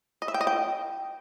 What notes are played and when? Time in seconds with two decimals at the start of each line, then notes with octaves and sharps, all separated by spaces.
0.22 D#5
0.28 E5
0.34 G5
0.41 D#5
0.47 G5